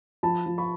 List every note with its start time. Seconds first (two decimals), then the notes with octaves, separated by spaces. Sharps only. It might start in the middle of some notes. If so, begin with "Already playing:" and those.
0.23 F3 A5 B5
0.46 F3
0.58 B5 C#6